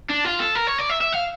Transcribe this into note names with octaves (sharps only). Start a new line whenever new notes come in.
D4
F4
A4
A#4
C#5
D5
E5
E5
F5